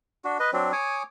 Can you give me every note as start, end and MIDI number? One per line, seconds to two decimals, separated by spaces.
0.24 0.38 62
0.24 0.38 66
0.40 0.51 71
0.40 0.51 75
0.53 0.72 54
0.53 0.72 60
0.53 0.72 62
0.72 1.03 73
0.72 1.03 80
0.72 1.03 86
0.72 1.03 87